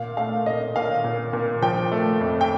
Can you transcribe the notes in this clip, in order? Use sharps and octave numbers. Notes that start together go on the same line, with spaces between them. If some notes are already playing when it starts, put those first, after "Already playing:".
Already playing: A#2 F5
A3 F5
A#2 D#5
A#2 F5
A#2
A#2
F3 G5
A3
F2
G5